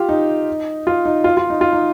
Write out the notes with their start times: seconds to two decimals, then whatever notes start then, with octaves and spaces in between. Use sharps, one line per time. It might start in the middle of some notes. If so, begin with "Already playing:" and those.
Already playing: F4 G4
0.09 D#4
0.87 F4
1.05 D#4
1.24 F4
1.37 F4
1.50 D#4
1.61 F4
1.73 D#4